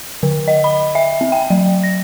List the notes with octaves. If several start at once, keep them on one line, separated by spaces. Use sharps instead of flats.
D3
D#5
B5
E5
C4
G5
F#3
A#6